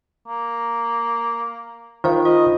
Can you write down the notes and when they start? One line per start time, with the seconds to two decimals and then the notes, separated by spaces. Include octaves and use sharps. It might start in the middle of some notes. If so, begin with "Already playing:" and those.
0.28 A#3
2.04 D#3 F4 C5 F5
2.25 F4 D#5